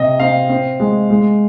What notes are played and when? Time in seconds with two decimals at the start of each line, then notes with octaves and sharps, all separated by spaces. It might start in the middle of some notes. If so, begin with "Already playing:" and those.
Already playing: C3 D#5
0.19 C4 F5
0.49 C4
0.80 G#3
1.10 G#3